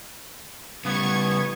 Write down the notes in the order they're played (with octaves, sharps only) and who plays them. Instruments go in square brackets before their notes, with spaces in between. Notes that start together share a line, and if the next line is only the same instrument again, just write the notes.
[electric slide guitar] C#3 G3 [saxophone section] B3 [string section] C#6 G#6